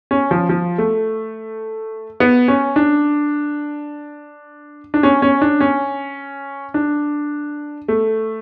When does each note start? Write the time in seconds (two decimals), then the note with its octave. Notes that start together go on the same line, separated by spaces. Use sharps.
0.11 C#4
0.31 F3
0.49 F3
0.78 A3
2.20 B3
2.48 C#4
2.76 D4
4.94 D4
5.03 C#4
5.22 C#4
5.42 D4
5.61 C#4
6.74 D4
7.88 A3